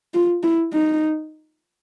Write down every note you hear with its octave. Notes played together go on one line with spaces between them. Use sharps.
F4
E4
D#4